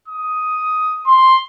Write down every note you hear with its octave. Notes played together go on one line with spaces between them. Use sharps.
D#6
C6